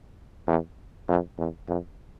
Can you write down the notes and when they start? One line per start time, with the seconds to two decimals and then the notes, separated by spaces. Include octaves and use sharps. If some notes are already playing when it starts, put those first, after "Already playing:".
0.47 E2
1.08 F2
1.38 E2
1.68 F2